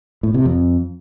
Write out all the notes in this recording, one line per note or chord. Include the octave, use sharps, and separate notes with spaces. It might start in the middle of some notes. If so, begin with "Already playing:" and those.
A2
C3
F2